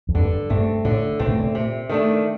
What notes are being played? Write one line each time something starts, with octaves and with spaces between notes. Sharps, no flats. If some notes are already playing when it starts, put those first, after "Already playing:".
F2
G2 D3
G2 A3 C4
A2 D3
A#2 A3 C4
A2
A#2
C3
D#3 A3 D4